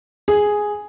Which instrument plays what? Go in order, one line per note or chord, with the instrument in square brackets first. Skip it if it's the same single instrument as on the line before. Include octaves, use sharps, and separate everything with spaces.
[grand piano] G#4